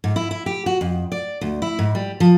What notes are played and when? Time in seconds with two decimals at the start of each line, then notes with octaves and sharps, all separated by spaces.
0.04 G#2
0.16 E4
0.31 E4
0.46 G4
0.66 F#4
0.81 F2
1.12 D5
1.41 D2
1.62 E4
1.79 G#2
1.95 G3
2.20 F3